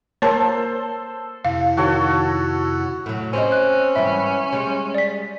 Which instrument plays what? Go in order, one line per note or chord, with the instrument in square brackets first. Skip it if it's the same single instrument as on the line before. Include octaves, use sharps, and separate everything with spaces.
[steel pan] A#3 [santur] A4 C5 [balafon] C#5 A5
[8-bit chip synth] F2 C3 E4 [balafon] F5
[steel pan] D#3 [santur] F#4 A4 C#5
[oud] A2 F#3
[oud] C4 G4 D#5 [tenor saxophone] C#4
[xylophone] F#6
[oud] G#2 E3 G3 [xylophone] E5
[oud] G3 G#3
[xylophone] D5 B6